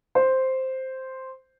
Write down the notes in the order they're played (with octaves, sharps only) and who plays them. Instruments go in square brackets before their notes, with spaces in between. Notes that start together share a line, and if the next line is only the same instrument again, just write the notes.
[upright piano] C5